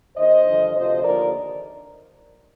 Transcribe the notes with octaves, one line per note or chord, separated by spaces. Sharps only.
D#2 D#3 C5 D#5
G2 D3 F3
D2 C3 F3 C5 D#5
D#2 D3 F3 A#4 D5